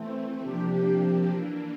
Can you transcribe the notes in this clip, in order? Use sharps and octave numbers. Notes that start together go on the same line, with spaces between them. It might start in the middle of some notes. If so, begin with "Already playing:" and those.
Already playing: E3 A3 C4
C3 F3 A#3 D4 G4
E3 A#3 D4